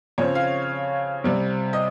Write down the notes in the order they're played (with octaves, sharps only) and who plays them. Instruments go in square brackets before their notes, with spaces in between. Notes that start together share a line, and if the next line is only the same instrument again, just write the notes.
[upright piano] C#3 F3 C4 C#5
F5
C3 G3 C4
D#5